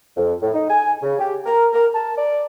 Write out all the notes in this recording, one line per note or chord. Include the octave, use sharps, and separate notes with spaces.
F2
A2
D#4
G#5
C#3
G4
A#4
A#4
A5
D5